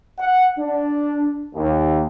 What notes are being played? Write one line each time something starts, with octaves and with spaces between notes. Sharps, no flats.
F#5
D4
D#2